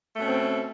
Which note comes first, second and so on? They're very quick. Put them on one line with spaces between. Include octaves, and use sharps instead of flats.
A3 B2 C#4 C4